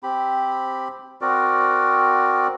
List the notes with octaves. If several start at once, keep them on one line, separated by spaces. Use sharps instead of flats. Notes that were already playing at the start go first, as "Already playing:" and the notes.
C4 G4 B5
C4 F#4 A#4 D5